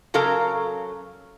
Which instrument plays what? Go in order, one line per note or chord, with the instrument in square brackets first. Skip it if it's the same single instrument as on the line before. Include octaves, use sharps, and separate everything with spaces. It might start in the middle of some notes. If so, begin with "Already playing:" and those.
[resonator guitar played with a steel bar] C#3 F#3 A4 A#4 F5 A#5